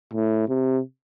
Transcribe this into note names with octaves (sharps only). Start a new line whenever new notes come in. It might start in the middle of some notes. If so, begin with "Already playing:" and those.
A2
C3